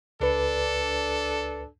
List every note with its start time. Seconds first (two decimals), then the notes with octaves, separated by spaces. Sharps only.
0.20 C#2 D4 A4 B4